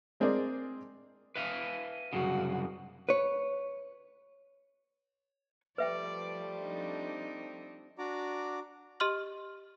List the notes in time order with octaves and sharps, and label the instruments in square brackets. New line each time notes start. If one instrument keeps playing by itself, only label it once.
[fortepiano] G#3 C4 G#4 A#4 D5
[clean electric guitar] B4 E5 F5
[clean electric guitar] C2 F#2 C#3 [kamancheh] F#4
[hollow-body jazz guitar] B4 C#5
[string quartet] F3 G3 A3 [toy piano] B4 E5 G5 [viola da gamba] D5
[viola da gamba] C4 D4 D#4
[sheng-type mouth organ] D4 F#4 D5 A#5 D6
[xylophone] G4 D#5 C6 F6 F#7